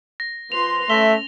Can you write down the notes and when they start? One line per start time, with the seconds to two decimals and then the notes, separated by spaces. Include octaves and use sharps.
0.20 A#6
0.52 F3 B4 C6 F7
0.90 A3 C#4 E5 A#6 G7